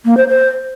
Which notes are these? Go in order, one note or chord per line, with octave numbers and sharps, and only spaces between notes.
A#3
C5
C5